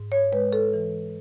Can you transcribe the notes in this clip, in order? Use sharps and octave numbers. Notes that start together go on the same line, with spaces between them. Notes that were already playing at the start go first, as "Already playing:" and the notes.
Already playing: G#2
C#5
G#3 B4
A4
E3